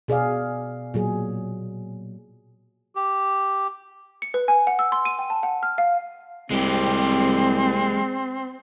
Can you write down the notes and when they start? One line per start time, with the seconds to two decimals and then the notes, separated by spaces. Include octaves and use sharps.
0.08 B2 G#4 D5 F5
0.94 A#2 F#3 G#4
2.95 G4
4.22 C#7
4.34 B4
4.48 G#5
4.67 F#5
4.79 E6
4.92 C6
5.05 D#7
5.19 G5
5.30 A5
5.43 F#5
5.63 F6
5.78 F5
6.51 C2 G#3 C4 G4